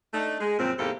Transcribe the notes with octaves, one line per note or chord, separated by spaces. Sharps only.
A3 D4 D#4
G#3
F#2 A#2 F3 C4
E2 G#2 C3 A#3 G4 A4